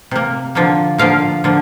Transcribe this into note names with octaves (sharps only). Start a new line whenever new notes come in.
C3 A#3
D3 F3 A#3
D3 F3 A#3 F5
D3 F3 A#3